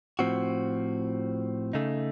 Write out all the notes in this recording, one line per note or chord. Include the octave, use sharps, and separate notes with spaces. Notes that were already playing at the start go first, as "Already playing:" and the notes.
A2 F3 C4 F#4
C#3 A3 D#4